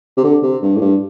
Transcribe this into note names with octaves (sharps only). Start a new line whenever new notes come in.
C3
D3
C3
G2
A2
G2